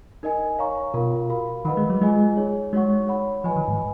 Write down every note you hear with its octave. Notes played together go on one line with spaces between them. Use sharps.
D#4 A#4 D#5 G#5
C#5 F5 A#5 C#6
B2 F4 A#4 F5
F#4 A#4 F5 B5
D#3 B4 D#5 F#5 B5
G#3
F#3
G#3 F4 G#4 D#5 G#5
D#4 G#4 C#5
G#3 D#4 F#4 C#5 F#5 C#6
C#5 F#5 B5
F3 B4 D#5 G#5 B5
D#3
G#2